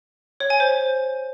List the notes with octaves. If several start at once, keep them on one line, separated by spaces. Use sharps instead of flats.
C#5
G#5
C5